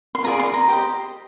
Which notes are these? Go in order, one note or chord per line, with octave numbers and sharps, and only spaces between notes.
C6
F4 G#4 D5 A#5
C6
A#5
G4 C5 D#5